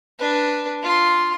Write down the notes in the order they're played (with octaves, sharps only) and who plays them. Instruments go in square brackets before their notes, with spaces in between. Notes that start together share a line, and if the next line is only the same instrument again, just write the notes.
[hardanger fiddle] D4 B4
F4 C6